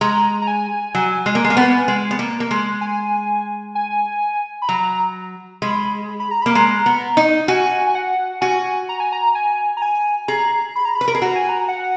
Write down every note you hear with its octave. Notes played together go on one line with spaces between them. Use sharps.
G#3 A#5
A#5
G#5
F#3
G#3
A#3
G#3
A#3
B3
G#3
B3
A#3
A#3
G#3
G#5
G#5
B5
F#3 A#5
G#3 B5
B5
A#5
A#3 B5
G#3 A#5
B3
D#4
F#4 G#5
G#5
F#5
F#4 G#5
A#5
G#5
A#5
G#5
A#5
G#5
G#4 A#5
B5
A#5
B5
B4
A#4
G#4
F#4 A#5
G#5
A#5
F#5